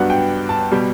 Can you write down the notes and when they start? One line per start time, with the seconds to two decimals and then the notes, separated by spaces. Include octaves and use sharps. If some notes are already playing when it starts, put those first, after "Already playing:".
Already playing: G2 F#3 B3 D4 F#5
0.10 G5
0.49 A5
0.72 B2 G3